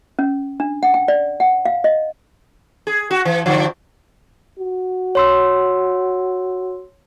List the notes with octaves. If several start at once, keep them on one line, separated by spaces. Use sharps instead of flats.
C#4
D4
F#5
G5
D5
F#5
F5
D#5
G#4
F#4
E3
G2 D3 F3
F#4
C#5 C6 E6